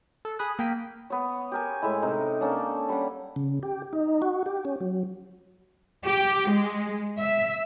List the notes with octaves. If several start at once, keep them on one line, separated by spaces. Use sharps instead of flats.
A4
G#4 B5 D#6 F#6
A#3 G5 B6 D#7
B3 C#5
G4 A#4 G#5
A2 G#3 E4
C3 D#4 A#4
A#3 C#4 D4 A4
G3 C#4 F#5
C#3
G4
D#4
F#4
G4
C#4
F#3
G4
G#3
E5